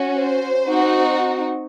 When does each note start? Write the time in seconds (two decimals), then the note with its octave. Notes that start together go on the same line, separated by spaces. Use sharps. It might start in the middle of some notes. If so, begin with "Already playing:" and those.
Already playing: C#4 F#4
0.17 C5
0.65 C4 D#4 F#4